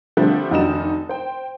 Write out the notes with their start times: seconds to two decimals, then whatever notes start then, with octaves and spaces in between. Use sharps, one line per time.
0.17 D3 F3 G3 A3 C4 D4
0.51 F1 D#3 D4 D#4 F#4 E7
1.09 C5 G5